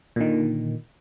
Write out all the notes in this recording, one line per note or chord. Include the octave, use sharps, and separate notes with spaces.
A#2 D3 D#3